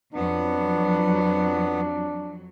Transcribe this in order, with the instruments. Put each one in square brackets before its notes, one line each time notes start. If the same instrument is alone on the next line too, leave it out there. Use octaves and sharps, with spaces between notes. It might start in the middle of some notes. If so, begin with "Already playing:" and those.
[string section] F2 F#3 [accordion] B3 [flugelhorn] D4